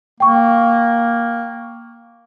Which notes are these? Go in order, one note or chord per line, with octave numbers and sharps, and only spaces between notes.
A#3 G5 C#6